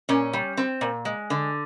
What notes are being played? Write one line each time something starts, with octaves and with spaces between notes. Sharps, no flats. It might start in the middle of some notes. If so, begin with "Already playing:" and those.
A#2 C#4
G3
C4
A#2
G#3
D3